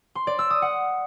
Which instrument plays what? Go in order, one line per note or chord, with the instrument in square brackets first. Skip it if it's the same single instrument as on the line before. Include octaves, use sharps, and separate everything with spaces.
[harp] C6
D5
E6
D#6
F#5